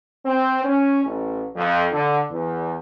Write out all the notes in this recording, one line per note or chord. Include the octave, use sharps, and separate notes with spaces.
C4
C#4
A1
F2
D3
E2